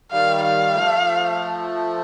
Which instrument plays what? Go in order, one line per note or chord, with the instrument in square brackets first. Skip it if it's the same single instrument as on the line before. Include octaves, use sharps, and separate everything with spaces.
[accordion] D#3 G3 [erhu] F5
[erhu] F5
[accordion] F3 A3